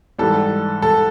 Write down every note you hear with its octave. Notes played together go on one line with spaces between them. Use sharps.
G#2 E3 G3 A4
A4